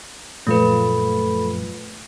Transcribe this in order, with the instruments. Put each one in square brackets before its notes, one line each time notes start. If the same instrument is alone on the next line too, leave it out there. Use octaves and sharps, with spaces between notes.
[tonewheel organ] F#2 [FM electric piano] A#2 F3 F4 [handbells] A3 B4 [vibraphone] A4 B5